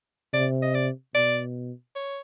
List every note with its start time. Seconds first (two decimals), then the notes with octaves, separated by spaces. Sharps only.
0.33 C3 D5
0.62 D#5
0.74 D5
1.15 B2 D5
1.95 C#5